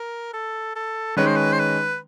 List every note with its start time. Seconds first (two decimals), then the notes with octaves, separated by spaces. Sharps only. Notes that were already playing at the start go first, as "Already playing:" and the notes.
Already playing: A#4
0.34 A4
0.76 A4
1.17 D#3 G#3 C#4 B4
1.26 C5
1.36 B4
1.52 C5
1.59 B4